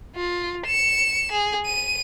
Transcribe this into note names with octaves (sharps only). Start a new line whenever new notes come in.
F4
C#7 E7
G#4
D#7